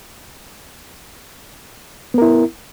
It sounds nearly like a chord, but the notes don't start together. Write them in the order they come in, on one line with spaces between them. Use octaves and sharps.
B3 A#4 E4